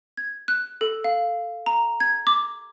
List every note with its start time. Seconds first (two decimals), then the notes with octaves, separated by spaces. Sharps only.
0.17 G#6
0.48 F#6
0.81 A4
1.04 F5
1.66 A#5
2.00 G#6
2.27 D6